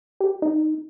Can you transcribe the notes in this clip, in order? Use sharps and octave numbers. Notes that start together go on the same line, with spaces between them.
G4
D#4